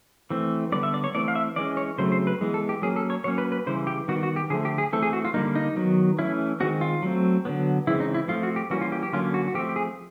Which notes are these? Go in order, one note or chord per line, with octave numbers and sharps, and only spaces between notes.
E3 A3 C4
D3 G3 B3 D5
E5
D5
C#5
E3 A3 C4 D5
F5
E5
E3 G#3 C#4 D5
C#5
C#3 F#3 A3 C4 C5
C5
B4
E3 G#3 B3
A4
G4
F#3 A#3 C#4 G#4
A4
C#5
F#3 A#3 C#4 C#5
B4
B4
C#3 E3 G3 C5
G4
D#3 G3 B3 F#4
F#4
G4
D3 F3 A3 G#4
G4
G#4
E3 A3 C4 A4
G#4
F#4
F4
D3 G3 A#3 D#4
D#4
D#3 F#3 B3
E3 A3 C#4 E4
D#3 G#3 C4 F#4
F4
F#3 A3 C4
D3 F#3 B3
C#3 E3 G#3 C4 E4
D#4
E4
F3 A3 C4 F4
F#4
G4
E3 G3 A#3 C#4 F#4
F4
G4
G4
D3 F#3 A#3 C#4 F4
F#4
F#4
F3 A3 C4 G4
G4
G#4